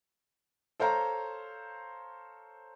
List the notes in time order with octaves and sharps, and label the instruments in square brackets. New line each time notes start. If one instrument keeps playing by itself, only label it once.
[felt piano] A4 C5 C#5 F5 A#5